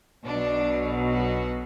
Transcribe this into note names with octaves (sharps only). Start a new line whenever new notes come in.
B1 B2 F#3 D4
F#4